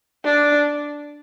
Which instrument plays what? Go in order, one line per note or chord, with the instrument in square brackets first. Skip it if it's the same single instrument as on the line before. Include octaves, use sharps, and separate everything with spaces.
[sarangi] D4